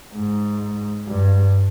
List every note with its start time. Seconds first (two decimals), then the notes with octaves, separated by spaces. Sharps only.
0.14 G#2
1.07 G2